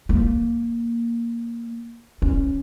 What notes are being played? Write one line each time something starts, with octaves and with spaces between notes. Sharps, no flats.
A#3
C#4